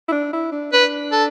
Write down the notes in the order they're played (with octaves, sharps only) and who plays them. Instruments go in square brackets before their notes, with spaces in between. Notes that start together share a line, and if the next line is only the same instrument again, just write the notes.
[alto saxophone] E4
D4
E4
D4
[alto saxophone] D4 [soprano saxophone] B4
[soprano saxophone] A4